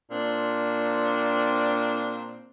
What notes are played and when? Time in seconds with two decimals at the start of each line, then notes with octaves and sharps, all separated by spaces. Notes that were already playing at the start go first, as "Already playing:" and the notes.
0.10 A#2 C4 D4